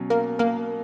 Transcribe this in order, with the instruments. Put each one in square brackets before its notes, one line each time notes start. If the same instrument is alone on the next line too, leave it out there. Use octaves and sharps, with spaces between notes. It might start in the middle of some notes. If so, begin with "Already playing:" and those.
Already playing: [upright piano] B2 F#3 C#4
[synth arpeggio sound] A#3 A#4
A#3 A#4